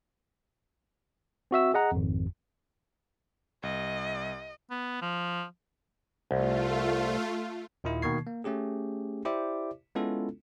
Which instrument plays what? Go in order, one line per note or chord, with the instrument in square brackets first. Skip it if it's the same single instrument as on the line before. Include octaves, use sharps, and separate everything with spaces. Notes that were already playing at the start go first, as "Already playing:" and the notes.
[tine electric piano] C4 F#4 E5 E6
G#4 D#5 F#5 A#5
G#1 F2
[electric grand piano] C2 [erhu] D#5
[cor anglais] B3
F3
[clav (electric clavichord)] C2 [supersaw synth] A3 F4
[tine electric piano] D#2 A#2 D#3 D#4 E4
B2 D#3 A#3 C#6 G#6 C7
A#3
A3 C#4 G4 G#4
E4 G4 C5 D5 E5 D6
G#3 B3 C#4 E4 F4 A4